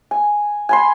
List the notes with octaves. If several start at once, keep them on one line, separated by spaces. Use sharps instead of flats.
G#5
G#5 B5 C6